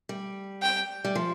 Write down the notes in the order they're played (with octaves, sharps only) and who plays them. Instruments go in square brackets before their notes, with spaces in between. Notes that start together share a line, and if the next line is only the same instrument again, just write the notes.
[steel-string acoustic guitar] G3
[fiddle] G5
[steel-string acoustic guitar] G3
F3